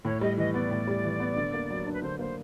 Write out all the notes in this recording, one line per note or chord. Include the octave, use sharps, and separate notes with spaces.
A2 C#5
G3 D#5
E3 D#5
B3 D5
A2
G3
E3
B3
D3
A#3
F#3
D4
B4
D3 C5
A#3 C5